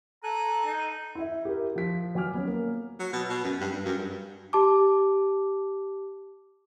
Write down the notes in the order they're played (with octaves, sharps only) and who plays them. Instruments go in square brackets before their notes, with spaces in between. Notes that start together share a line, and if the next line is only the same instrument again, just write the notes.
[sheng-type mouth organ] A4 G#5 F#6 [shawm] A#5
[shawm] D#4
[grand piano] E4 E5
G4 A#4
F3 B6
F#3 G#5 D6 F6
B3 C#4
A#3
[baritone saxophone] F#3
B2
B2
F#2
G2
G2
F#2
G2
[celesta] G4 A5 D6